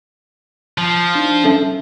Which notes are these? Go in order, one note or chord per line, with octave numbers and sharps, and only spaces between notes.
F3
D4 D#4
C#4 A4 E5